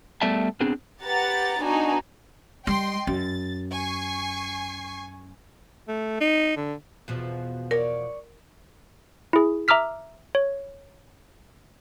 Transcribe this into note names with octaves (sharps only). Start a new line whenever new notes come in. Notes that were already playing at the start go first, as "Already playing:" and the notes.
G3 A3 B3 D5 E5 A5
B3 C4 D4 G#4
G4 B4 F#5 A#5 A6
B3 D4 D#4 F#4 G#5
G3 D#5 G5 C6
F#2 A6
G#5 C#6 C7
A3
D#4
D3
E2 B2 F3
A#4 C#5 D5
E4 G#4
E5 A#5 D6 E6 F6 B6
C#5